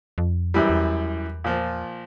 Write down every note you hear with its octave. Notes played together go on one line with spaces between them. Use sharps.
F2
F#2 E3 G3
E2
A#2 F3